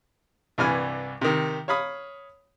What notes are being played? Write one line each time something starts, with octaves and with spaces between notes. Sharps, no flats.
C2 G2 E3 D5 G#5 F6
C3 D#3
C#5 F5 B5 D#6